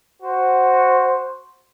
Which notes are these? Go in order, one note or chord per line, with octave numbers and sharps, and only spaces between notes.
F#4 C5